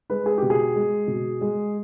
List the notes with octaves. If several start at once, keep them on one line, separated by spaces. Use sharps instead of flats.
G#3 B4
G#4
B2 G4
G#4
G#3
B2
G#3